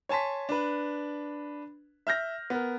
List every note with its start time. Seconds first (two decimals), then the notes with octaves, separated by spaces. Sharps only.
0.09 C#5 G#5 A5 C6 B6
0.49 D4 B4
2.07 E5 F6 G6 A#6
2.50 B3 A#4